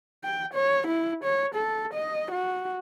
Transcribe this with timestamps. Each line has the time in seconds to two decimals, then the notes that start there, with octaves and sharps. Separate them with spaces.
0.24 G5
0.54 C#5
0.87 E4
1.24 C#5
1.55 A4
1.94 D#5
2.32 F#4